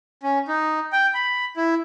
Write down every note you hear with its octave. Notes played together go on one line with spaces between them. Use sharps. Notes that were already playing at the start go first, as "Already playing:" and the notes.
C#4
D#4
G5
B5
E4